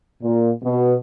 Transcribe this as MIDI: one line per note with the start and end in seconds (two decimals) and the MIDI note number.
0.22 0.51 46
0.63 0.94 47